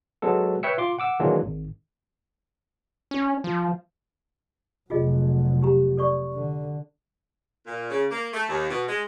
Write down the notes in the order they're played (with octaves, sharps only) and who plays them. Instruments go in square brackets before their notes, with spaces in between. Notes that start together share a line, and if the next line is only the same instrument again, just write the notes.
[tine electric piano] F#3 G#3 B3 A4
B4 C#5 E5 G5 E6 C#7
F4 C6 D6
F#5 D6 E6
D#3 E3 F#3 G#3 A#3 D4
G#1
[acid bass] C#4
F3
[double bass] F1 F#3 [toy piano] F4 G#4 D#5
[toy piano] G4 A#5
A4 D5 C#6
[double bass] D3
[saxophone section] A#2
C#3
A#3
A3
D#2
B2
G#3